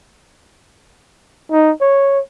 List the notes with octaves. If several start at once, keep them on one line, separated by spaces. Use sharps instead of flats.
D#4
C#5